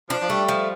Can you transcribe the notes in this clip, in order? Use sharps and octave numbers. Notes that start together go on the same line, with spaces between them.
F3 D4
F3
G3 A3
F3